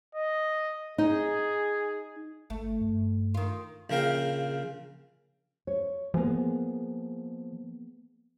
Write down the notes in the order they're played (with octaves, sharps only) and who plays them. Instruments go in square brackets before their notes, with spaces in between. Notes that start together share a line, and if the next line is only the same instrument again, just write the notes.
[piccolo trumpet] D#5
[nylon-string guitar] D#4 [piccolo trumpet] G#4
[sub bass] G#1 [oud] A3
[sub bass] G2
[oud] D#3 F4
[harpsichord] A#1 C#3 A#4 F5 G5
[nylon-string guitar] C#5
[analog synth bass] F3 [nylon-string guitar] A#3 B3 G#4